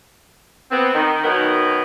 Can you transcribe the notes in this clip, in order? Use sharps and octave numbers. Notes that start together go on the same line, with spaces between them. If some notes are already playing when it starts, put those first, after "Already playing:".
B3 C4
D#3
B2 D#3 F#3 B3 D#4 A#4